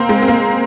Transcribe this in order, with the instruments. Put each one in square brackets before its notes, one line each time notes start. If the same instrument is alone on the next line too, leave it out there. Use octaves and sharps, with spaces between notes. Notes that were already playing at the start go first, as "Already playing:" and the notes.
Already playing: [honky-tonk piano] A#3 C4
G#3
C4
A#3